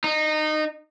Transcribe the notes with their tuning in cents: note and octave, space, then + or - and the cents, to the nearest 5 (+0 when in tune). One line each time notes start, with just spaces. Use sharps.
D#4 -20